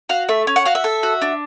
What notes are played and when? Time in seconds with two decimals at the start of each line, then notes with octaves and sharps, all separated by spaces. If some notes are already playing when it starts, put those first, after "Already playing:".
0.09 F#4 F5
0.29 A3 E5
0.47 C#4
0.56 F#5
0.65 F#4 F5
0.75 E5
0.84 A4
1.03 F#4
1.22 D4